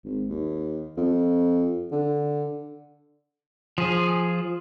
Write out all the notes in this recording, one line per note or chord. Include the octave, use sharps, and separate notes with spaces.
G#1
D#2
F2
D3
F3 G#4